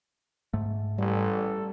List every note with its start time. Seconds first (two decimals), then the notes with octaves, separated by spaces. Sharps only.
0.53 G#2 A3
0.98 A1 G3 A4